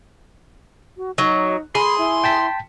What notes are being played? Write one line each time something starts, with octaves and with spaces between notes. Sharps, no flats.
F#4
F#3 D#4
G#4 B5 C6
E4
G5 A5 B6